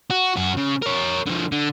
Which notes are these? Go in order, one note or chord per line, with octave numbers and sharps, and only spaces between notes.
F#4
F#2 F#4
C#3
A#4 C#5
D3 F3
D3